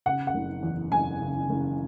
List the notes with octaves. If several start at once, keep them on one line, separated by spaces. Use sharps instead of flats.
C#3 F#5
F#5
F#1
E2
F#1 G#5
C#3
F#1